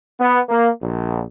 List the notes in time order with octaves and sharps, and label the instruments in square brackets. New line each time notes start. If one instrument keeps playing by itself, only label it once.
[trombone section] B3
A#3
A#1